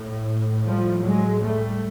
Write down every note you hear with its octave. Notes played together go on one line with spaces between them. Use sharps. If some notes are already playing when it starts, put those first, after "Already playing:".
Already playing: A2
F3 G3
F#3 G#3
G3 A3